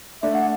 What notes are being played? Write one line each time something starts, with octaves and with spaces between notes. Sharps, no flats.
A3 D4 E5
F#5